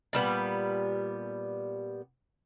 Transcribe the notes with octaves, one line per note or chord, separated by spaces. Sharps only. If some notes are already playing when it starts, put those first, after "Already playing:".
A#2 G3 B3